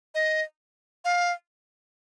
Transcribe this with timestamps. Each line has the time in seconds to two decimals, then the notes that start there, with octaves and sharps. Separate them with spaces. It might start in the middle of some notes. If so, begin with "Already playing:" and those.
0.15 D#5
1.05 F5